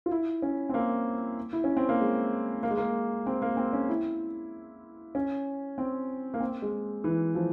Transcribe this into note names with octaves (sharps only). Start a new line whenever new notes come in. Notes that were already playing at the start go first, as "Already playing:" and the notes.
F4
E4
C#4
C4
A#3
E4
C#4
C4
A#3
G#3
A#3
G#3
A#3
C4
A#3
C4
C#4
E4
C#4
C4
A#3
C4
G#3
E3
F3